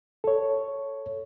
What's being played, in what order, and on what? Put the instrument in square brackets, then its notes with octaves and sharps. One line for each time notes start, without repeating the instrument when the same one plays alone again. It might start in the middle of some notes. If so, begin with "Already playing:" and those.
[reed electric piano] A4 C#5